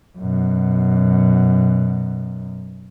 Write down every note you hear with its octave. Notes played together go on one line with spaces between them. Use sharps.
F#2 B2